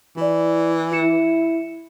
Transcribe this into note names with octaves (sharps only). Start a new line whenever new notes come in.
E3 E4 D5
E4 C#7 E7